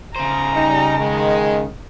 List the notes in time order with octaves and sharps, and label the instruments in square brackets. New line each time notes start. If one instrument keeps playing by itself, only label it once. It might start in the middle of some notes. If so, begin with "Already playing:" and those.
[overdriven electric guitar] C#3 C5 [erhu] A#5
[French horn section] G3 D#4
D#3 G#3